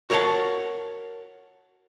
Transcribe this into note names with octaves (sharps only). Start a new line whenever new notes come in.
F#4 A#4 C#5 F5 F#5 A5